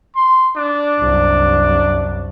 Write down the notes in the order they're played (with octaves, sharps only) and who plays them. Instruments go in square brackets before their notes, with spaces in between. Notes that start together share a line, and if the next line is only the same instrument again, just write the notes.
[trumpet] C6
D4
[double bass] C2 F#2